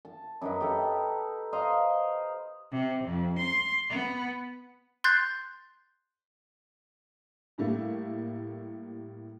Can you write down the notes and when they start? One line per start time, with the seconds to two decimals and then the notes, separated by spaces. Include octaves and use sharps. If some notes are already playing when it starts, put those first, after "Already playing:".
0.05 A5
0.42 F#2 D#4 B4
0.61 G4 A4
1.52 C5 D#5 F5 A#5
2.71 C3
3.03 F2
3.38 C6
3.89 B3
5.04 C6 F#6 G6 A6 C7
7.58 A2 G3 A3 A#3